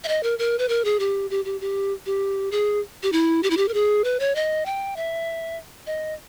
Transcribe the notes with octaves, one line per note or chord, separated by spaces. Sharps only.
E5
D#5
A#4
A#4
B4
A#4
G#4
G4
G4
G4
G4
G4
G#4
G4
E4
G4
E4
G4
A#4
G#4
B4
C#5
D#5
G5
E5
D#5